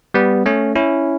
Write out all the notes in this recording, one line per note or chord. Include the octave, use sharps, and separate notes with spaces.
G3 B3
A3 C#4
C#4 E4